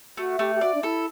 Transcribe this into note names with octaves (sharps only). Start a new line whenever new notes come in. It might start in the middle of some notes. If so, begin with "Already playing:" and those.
A3 F#4
A3 G4
G4
F#4 D5
D4
E4 A4